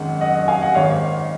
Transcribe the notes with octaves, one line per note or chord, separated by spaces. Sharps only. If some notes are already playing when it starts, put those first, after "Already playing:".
Already playing: G#1 F#2 D#3 G#3 F#5
D#5 F#5
D#5 F#5
F5 G#5
D#5 F#5
G#1 G#2 D#3 C#5 F5